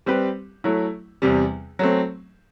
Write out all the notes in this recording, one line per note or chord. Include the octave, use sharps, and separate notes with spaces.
G3 C4 G4 B4
F#3 A3 E4
E2 C3 G3
F#3 A3 C4